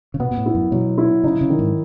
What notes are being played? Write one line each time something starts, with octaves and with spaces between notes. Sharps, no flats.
C#3
B2 B3
B2
A2
E4
F#2
B2 F#3
E4
C#3 D#4
C#3
D#3
G#2